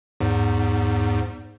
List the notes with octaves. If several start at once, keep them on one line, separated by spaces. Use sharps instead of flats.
E2 G#2